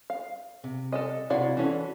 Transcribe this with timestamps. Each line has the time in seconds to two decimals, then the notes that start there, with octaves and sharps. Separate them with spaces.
0.10 F5
0.64 C3
0.92 A4 D5 D#5
1.30 C3 E4 F#4 D5 F5
1.57 E3 C#4 D4 F#4 A4